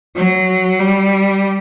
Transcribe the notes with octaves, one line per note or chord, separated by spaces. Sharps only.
F#3
G3